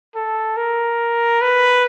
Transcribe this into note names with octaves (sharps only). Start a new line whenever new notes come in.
A4
A#4
B4